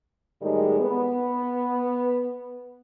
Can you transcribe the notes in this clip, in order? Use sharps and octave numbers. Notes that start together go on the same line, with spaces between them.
A2 D#3 G3 G#3
B3